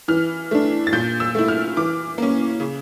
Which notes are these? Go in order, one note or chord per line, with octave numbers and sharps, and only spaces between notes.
E3 F6
A3 D4
A6
A#2 G6
E6
A3 E4
F6
E3 D6
A#3 C#4
C#3